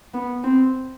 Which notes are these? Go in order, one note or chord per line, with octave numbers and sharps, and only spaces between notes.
B3
C4